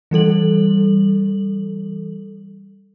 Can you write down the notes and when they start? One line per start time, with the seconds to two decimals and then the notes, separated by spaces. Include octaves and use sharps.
0.11 E3 G3 A4 F#7